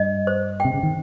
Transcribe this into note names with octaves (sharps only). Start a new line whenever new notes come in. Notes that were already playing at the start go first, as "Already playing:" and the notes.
Already playing: G2 G3 D#5
C5
C3 G5
C#3
D#3